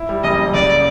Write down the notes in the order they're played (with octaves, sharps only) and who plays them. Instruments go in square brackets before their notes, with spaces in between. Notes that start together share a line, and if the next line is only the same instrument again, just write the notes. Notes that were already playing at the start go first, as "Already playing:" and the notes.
Already playing: [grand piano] E4
G3
[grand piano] F#1 [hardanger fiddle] D#5
[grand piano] F#1
[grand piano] C#2 [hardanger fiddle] D5